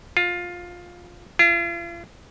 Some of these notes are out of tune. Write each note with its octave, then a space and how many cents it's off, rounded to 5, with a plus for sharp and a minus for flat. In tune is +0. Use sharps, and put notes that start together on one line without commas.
F4 +15
F4 -40